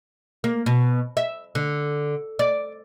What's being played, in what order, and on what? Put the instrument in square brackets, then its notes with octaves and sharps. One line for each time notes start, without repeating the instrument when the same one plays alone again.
[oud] A#3
B2
E5
D3
D5